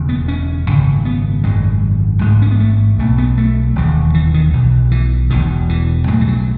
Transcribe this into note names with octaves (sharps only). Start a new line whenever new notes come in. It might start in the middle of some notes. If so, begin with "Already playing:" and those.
Already playing: E1 E2 C#3
B3
C#4
G#1 F#2 C#3
B3
G#1 F#2 C#3 G#3
A1 G#2 G#3
C#4
B3
A3
B1 B2 A3
B3
A3
E1 D#2 C#3
E3
D#3
B1 B2
E3
E1 E2 B2 D#3
E3
B1 A2 G#3
E3
F#3